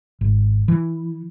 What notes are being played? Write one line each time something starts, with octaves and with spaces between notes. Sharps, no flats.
G#1
E3